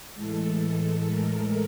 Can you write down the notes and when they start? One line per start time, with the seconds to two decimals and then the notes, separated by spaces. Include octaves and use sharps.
0.14 A2 E3 G#3 A4
1.03 A#4